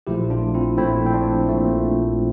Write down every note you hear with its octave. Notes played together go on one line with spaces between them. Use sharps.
A#1 A#2 F3 A3 E4 G4
D4 F4
C4 E4
A#1 A#2 F3 A3 C4 E4
C4
D4
A#1 A#2 F3 A3